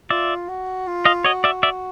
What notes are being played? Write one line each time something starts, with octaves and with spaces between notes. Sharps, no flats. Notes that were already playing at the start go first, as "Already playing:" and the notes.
F4 D5 E5
F#4
F4
D#5 F5
F#4 C#5 D#5
D5 E5
D5 E5